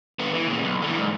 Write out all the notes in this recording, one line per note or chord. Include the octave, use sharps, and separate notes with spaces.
D3 B3
E3
A#2 C#3
B1
D3 E3
G#2